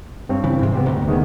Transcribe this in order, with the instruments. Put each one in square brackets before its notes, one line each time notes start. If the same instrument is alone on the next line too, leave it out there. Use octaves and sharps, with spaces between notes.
[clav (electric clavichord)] G2 C4 C#5
[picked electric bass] C#3 E3
G#2 C3
[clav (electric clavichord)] B3 G4 C5
[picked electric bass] D2 [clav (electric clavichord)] A#5
[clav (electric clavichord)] D#3 G#3 B3